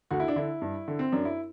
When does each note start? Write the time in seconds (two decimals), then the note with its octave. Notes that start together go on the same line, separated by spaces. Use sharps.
0.11 D2 F#4
0.20 E4
0.28 D4
0.36 D3 E4
0.62 G2
0.88 D3
0.99 C4
1.12 F#2 D4
1.25 E4